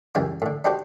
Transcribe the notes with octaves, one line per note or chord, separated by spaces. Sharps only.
C#2 F#2 E3 G3 G#5 D6
A2 D3
D4 D#4 F#4 G4 C5 D5